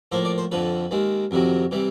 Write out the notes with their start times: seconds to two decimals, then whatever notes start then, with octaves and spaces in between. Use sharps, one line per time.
0.12 A2 F3 A#3 C5
0.25 D5
0.38 C5
0.51 F2 D3 F3 B4
0.91 D#2 D#3 G#3
1.31 F2 C3 D#3 F#3
1.71 C3 E3 G3